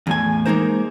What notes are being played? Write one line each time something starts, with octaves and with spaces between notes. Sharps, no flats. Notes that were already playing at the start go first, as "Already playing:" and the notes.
E2 A2 G#5
G#3 A#3 D#4 A#4 C5